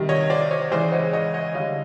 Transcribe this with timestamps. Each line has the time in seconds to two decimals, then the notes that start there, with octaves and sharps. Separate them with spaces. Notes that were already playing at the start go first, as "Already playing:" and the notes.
Already playing: C3 D#3 G3
0.09 C#5 D#5
0.30 C5 D5
0.51 C#5 D#5
0.71 C#3 E3 G#3 C5 D5
0.92 C#5 D#5
1.13 C#5 D#5
1.34 C#5 D#5
1.55 D3 G3 D#5 F5